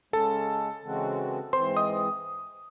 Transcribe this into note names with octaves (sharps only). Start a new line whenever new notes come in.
C#3 G#3 C#4 A4 A5
C#3 E3 G#3 C4 F#4
G#2 E3 C4 C5 C6
D#5 D#6